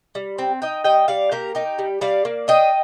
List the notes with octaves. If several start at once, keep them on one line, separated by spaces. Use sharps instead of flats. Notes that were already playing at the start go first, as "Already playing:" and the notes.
G3
C4
D#4 D#5 G5
G3 D#5 G5
G3 D5 F5
A#3 G4 A#4
D#4 G4
G3
G3 D5 F5
A#3
D4 D#5 G5